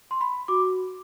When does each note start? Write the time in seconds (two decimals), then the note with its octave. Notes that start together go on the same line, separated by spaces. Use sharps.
0.11 C6
0.21 B5
0.48 F#4 D6